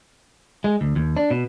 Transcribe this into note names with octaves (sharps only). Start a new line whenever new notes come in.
G#3
D2
D#2
D4
B2